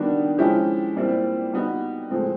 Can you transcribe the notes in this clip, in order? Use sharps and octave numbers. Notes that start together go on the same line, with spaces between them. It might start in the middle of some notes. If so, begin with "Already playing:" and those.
Already playing: D#3 G3 B3 D4 F#4
F3 G#3 C#4 E4 G4
A#2 G3 C4 E4
G3 B3 D#4 F#4
A2 F3 G#3 C4